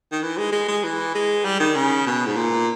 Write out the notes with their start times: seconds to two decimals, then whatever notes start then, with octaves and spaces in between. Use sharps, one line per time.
0.12 D#3
0.22 E3
0.37 G#3
0.52 G#3
0.68 G#3
0.84 E3
1.15 G#3
1.45 G3
1.60 D#3
1.76 C#3
2.06 B2
2.26 G#2
2.36 A#2